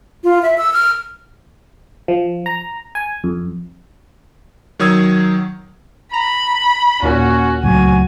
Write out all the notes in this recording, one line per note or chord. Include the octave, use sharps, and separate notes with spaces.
F4
E5
E6
F6
F3
A#5
G#5
F2
D#3 F#3 C#5 D#6 E6 G#6
A#5 B5
D#2 A#2 C#4 F#4
C#2 A2 F#3 F#4 G#5